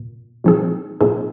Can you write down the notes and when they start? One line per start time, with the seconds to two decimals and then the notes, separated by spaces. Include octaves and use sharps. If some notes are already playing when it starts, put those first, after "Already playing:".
Already playing: A#2
0.44 A#2 F3 C4 D#4 G#4
1.01 A#2 F3 C4 D#4 G#4